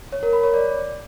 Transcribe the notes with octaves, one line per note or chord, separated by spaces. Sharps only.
C#5
A#4
B5
C#5
D5